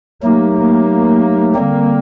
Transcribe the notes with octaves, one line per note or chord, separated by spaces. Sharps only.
F#3 A3 A#3 D#4 G4
A#3
D3 G3 A#3 C4